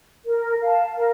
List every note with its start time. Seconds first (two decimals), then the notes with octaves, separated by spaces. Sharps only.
0.25 A#4
0.61 F5 A5
0.97 A#4